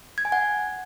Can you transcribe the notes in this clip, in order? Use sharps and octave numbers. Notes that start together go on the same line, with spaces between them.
G#6
G#5
F#5